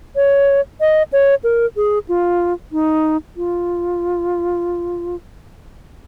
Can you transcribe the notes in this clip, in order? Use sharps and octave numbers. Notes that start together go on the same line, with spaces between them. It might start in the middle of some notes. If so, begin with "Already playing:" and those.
C#5
D#5
C#5
A#4
G#4
F4
D#4
F4